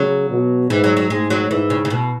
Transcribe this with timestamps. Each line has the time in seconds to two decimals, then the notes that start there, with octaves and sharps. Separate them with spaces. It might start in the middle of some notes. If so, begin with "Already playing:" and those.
Already playing: C#3 F#3
0.30 B2
0.70 G#2 E3
0.84 F#3
0.97 F#3
1.10 G#2 G#3
1.30 F#3
1.50 G#2 E3
1.70 C#3
1.85 C#3
1.90 B2